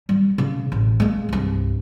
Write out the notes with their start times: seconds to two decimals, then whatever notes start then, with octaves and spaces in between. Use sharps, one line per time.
0.09 G3
0.38 C#3
0.72 A1
1.00 G#3 A#3
1.29 C2 G2